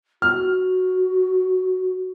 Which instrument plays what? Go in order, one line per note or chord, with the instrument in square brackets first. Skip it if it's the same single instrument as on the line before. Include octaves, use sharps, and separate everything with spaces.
[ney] F#4 [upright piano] F6